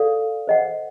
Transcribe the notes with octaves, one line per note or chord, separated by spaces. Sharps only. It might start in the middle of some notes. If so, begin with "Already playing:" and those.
Already playing: A4 D5 F5
C5 D#5 F#5